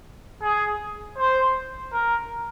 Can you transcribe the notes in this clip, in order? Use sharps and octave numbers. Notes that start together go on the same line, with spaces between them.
G#4
C5
A#4